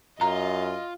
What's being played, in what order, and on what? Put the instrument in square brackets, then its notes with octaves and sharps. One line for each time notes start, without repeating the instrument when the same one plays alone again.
[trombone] F#2 [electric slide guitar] F4 [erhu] D#5 [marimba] A#5